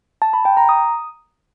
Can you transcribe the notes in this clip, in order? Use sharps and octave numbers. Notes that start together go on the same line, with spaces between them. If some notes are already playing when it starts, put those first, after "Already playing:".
A5
B5
G5
A#5
D#6